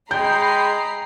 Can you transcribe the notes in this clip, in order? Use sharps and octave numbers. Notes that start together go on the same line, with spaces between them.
G#3 G5 A#5 B5 G6 C7